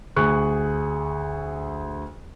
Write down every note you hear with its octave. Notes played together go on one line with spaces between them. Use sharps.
D2 G#4 C#6 F#6